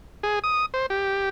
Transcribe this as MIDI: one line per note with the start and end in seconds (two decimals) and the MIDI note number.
0.23 0.39 68
0.44 0.66 87
0.74 0.86 72
0.90 1.29 67